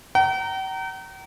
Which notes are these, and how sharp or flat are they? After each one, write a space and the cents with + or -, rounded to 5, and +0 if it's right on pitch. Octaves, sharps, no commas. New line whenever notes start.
G5 -45 A#5 -15